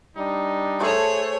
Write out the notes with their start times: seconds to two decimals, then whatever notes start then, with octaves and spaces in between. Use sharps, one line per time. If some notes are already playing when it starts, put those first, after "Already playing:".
0.17 G3 D4 D#4
0.80 A3 G#4 A4 C5 C#5